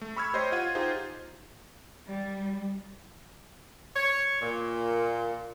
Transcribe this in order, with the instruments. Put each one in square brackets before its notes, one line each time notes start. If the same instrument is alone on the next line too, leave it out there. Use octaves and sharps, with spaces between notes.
[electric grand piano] A3
B5 C#6 E6 F6 G#6
G4 C5 C#5 D#5 C6
F4 F#5 G#6 D#7
D#4 F4 G4 G#4 C5
[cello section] G3
[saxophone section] C#5
A#2